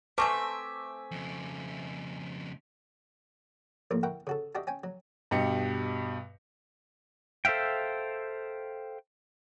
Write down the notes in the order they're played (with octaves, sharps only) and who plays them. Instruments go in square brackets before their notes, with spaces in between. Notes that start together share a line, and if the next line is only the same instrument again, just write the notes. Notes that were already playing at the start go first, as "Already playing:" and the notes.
[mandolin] A3 C4 E5 [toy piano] B4 A5 C#6 [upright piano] G#5 D6
[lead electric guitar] F2 C#3
[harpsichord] A#1 A2 A#3 F4
E4 A#4 F#5 G5 C#6
C#3 F#4 A4
D4 F#4 G4 D#5 E5
C#4 G5 G#5
F#3
[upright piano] G2 B2 G4 D#5 C#7
[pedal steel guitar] A4 C5 E5 F5 G5